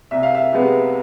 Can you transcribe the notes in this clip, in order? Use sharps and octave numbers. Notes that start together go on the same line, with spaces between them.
C2 E5
F5
E5
C3 G#3 B3